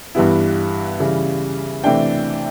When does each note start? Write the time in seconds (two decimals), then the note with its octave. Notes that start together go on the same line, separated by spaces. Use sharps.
0.15 G2 E3 G3 B3 E4
1.00 C#3 E3 G3
1.84 C3 E3 A3 D4 G5